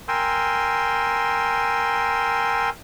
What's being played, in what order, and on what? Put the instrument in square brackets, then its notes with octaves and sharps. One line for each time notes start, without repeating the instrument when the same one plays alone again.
[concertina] A#4 G5 G#5 C6 E6